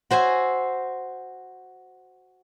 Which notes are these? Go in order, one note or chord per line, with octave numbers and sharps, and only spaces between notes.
F#4 C5 E5 G#5